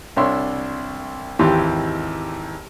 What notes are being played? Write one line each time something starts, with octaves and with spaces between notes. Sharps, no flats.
C2 D4 C#5 E5 C6
G#1 D#2 E3 G4 C6 D6